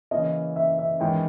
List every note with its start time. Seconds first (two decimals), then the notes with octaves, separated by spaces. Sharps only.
0.11 C#3 E3 A#3 C#4 D#5
0.56 E5
0.78 E5
1.00 E2 D#3 G#3 C#4 E4 G5